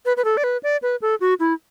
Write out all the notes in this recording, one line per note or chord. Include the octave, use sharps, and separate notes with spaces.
B4
B4
A4
D5
B4
D5
B4
A4
F#4
E4